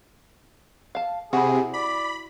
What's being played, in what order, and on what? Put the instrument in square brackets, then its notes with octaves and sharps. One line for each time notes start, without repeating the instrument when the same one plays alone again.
[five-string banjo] F5 A5
[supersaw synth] C3 [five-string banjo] E4 F#4 [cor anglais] G#4
[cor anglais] D5 [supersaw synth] B5